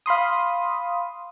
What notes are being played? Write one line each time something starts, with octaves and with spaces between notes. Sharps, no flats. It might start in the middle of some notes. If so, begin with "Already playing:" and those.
F5 B5 C6 D#6